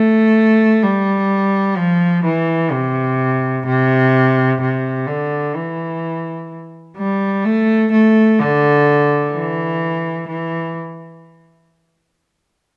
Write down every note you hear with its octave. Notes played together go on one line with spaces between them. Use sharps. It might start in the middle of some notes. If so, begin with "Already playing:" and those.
Already playing: A3
G3
F3
E3
C3
C3
C3
D3
E3
G3
A3
A3
D3
E3
E3